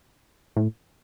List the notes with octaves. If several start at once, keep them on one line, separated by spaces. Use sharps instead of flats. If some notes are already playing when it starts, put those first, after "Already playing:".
A2